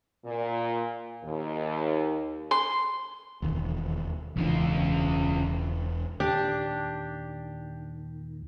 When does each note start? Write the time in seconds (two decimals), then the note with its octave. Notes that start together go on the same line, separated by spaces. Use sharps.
0.24 A#2
1.24 D#2
2.51 C6
3.42 E1 D#2
4.37 E1 E2 C#3 D4 F4
6.20 D#2 A#2 D#3 D4 G4